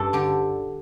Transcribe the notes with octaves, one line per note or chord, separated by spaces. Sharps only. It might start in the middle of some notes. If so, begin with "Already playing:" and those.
Already playing: G2 A4
D3 G4